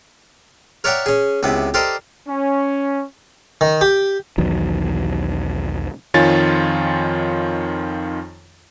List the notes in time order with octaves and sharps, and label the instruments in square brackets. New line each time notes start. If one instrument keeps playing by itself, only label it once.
[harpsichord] A#4 C#5 D5 E5 F#5 G5
C#4 G#4
C#2 C3 B3 E4
G4 A4 A#4 C5 D5 D#5
[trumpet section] C#4
[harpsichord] D#3
G4
[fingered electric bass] B1 E2 D#3 F#3
[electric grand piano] F2 D#3 F4 C#5 G#5 A6